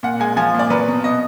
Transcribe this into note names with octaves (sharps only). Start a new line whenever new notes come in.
A#2 F#5
G#3 G#5
F3 G#5
A#2 D5
F#3 B4
B2
B2 D#5